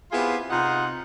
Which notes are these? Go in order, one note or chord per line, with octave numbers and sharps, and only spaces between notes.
B3 C4 E4 F4 G4 G#4
C3 D#4 F4 D#5 F#5